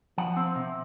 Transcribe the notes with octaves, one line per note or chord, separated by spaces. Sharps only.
F3 F#5
C4
C3